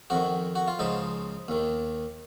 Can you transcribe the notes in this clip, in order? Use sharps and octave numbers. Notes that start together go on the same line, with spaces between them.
F2 D#3 F#4
F#4
F4
C#2 C#3 F3 D#4
D#2 D#3